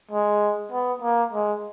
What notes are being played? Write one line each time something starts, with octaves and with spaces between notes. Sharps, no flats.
G#3
B3
A#3
G#3